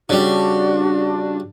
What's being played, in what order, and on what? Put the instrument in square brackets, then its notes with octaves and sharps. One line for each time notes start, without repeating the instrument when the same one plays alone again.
[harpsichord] C#3 G3 [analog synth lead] D4 [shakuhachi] F#4